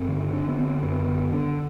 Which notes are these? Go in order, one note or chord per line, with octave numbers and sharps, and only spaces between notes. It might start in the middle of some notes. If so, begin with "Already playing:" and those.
Already playing: G2 C4
D3
D3 D4
B3
D3 C4
F#2 B3
D3
D3 D4